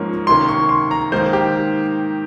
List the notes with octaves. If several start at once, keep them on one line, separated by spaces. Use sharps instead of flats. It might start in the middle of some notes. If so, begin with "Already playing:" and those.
Already playing: G#2 F3 A#3 C#4
C3 D#3 A#3 C#4 C6
C#6
C6
A#5
G#2 D#3 A#3 C5
G4